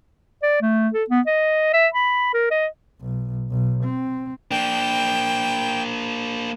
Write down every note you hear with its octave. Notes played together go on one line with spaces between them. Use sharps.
D5
A3
A4
B3
D#5
E5
B5
A#4
D#5
B1
B1
C4
A#3 D4 G5